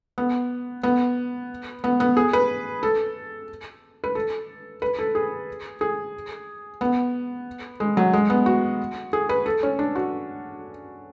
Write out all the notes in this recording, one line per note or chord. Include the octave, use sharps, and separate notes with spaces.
B3
B3
B3
B3
G#4
B4
A4
B4
A4
B4
A4
G#4
G#4
B3
G#3
F#3
G#3
B3
F#4
G#4
B4
A4
C#4
D4
F#4